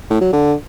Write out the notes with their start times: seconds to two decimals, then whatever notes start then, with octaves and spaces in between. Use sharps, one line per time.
0.10 A2
0.21 F#3
0.33 D3